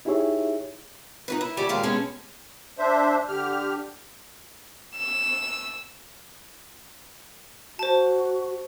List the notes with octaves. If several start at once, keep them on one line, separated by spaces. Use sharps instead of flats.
D#4 E4 G4 G#4 C#5 E5
D#4 F#4 B4
E4
D2 G3 A3 G4 D5 G#5
D#2 A#2 G#3 G4 F5
B2 G#3 C#4 G#4 A4
D4 C5 E5
D3 G4 F6
E6
F#4 C5 A5